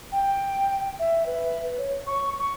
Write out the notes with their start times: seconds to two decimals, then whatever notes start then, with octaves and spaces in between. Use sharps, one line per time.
0.12 G5
0.99 E5
1.26 B4
1.78 C#5
2.06 C#6
2.39 C#6